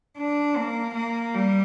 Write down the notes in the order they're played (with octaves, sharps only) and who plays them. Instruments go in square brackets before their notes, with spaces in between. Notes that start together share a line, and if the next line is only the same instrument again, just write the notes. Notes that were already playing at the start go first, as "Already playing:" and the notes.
[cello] D4
A#3
A#3
G3